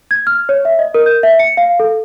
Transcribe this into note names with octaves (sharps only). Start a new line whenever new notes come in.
G#6
F6
C#5
E5
D#5
A#4
G6
E5
C#7
F5
A4